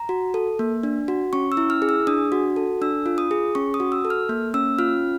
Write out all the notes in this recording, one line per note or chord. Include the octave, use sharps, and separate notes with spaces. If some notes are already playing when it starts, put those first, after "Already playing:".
Already playing: A#5
F#4
A4
A#3
D4
F#4
C#4 C#6
E6
E4
F6
G#4
E6
D4 D#6
F#4
A4
D4 E6
F4
D#6
G#4
C#4 C#6
D#6
F#4
E6
A4
F6
A#3
C#4 E6
F4 F6